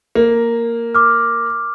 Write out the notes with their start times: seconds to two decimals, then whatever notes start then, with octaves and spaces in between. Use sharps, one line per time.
0.15 A#3
0.95 D6 F6